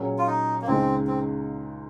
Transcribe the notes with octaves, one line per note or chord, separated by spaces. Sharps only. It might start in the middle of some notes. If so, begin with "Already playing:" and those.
Already playing: A#2 F#3 C#4 G#4 C#5
F4
D#4
A#3
C#2 C#3 G#3 C4 D#4
C4